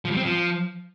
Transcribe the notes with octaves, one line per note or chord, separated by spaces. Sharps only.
F3
G3
C4
F3